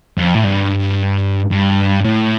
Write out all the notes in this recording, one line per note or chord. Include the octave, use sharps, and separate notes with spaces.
F2
A2
G2
G2
A2